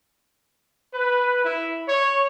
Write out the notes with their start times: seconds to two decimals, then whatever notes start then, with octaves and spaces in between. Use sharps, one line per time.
0.93 B4
1.45 E4
1.87 C#5